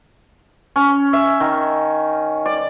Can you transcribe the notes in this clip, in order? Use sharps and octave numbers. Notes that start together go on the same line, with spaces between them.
C#4
E5
D#3
D5